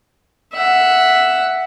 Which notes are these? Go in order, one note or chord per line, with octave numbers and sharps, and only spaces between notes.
E5 F#5